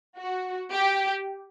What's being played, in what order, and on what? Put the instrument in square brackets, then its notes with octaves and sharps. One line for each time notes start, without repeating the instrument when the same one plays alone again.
[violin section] F#4
G4